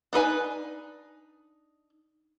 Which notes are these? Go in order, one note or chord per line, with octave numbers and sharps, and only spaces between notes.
D4 D#4 B4 G#5